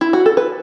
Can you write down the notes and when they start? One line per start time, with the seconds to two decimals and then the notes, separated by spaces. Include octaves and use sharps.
0.01 E4
0.13 F#4
0.26 A4
0.37 B4